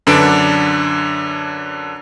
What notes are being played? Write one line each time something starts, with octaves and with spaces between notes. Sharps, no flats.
F#2 D3 D4 B4 D7